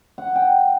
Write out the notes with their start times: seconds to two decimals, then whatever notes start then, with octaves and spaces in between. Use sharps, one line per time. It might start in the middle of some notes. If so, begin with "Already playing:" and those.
0.18 F#5
0.27 C#6
0.36 G5